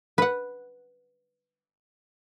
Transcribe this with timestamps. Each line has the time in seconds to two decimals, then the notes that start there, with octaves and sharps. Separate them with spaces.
0.18 B4 F#5